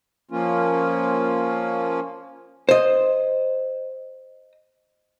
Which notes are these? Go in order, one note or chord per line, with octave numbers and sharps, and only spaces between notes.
F3 A#3 C#4 F4
C5 D#5